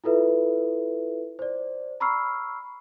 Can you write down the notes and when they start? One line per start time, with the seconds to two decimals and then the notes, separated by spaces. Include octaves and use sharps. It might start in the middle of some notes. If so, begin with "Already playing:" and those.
0.04 E4 F4 A4 B4 E5
1.39 C5 D5
2.00 A#5 B5 C#6 E6 F6 C7